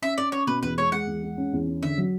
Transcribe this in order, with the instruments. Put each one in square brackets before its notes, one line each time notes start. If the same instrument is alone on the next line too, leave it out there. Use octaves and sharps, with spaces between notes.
[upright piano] C#4 [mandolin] E5
[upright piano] C#4 [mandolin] D5
[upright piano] C#4 [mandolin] C#5
[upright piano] B2 [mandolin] B4
[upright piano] E2 [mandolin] B4
[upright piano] G#3 [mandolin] C#5
[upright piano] G#3 [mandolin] F#5
[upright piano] E2
G#3
C#4
E2
C#4
[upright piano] D3 [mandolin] E5
[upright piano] F#3